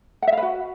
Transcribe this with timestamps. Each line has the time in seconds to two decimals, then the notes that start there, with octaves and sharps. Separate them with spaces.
0.22 F#5
0.27 E5
0.32 F5
0.37 B4
0.42 F#4